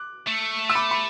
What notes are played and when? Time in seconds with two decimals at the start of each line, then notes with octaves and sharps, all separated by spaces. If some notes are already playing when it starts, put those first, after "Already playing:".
Already playing: D6 F#6
0.27 A3
0.70 E6
0.75 B5 D6
0.91 B5